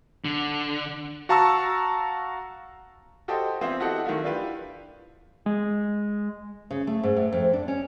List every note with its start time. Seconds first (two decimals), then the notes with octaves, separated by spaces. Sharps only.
0.25 D3
1.29 F#4 F5 A5 A#5 C#6 E6
3.28 F#4 G4 A4 C5 D#5 G5
3.61 E3 B3 C4 F4 C5 E5
3.80 E4 F#4 G4 A4 D#5 F#5
4.05 D#3 F#3 A3 E4 F4
4.24 D4 E4 F4 G4 B4
5.46 G#3
6.71 C#3
6.87 A3
7.03 G#2
7.17 A2
7.32 F2
7.53 D4
7.68 C#4